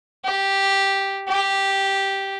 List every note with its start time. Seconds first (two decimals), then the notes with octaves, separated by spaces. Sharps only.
0.25 G4
1.28 G4